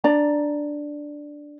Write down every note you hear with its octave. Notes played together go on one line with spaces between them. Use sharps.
D4 D5 A#5